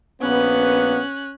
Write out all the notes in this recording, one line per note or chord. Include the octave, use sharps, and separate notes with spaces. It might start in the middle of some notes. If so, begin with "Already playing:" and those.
A#1 A#3 B3 C#4 F#6